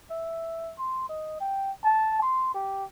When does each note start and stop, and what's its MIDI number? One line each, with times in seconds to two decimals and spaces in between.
0.10 0.73 76
0.78 1.05 84
1.09 1.40 75
1.40 1.71 79
1.84 2.21 81
2.22 2.50 84
2.54 2.85 67